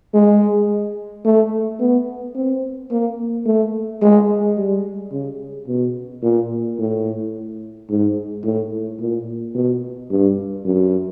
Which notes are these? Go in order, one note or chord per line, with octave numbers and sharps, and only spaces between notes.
G#3
A3
B3
C4
A#3
A3
G#3
G3
C#3
B2
A#2
A2
G#2
A2
A#2
B2
G2
F#2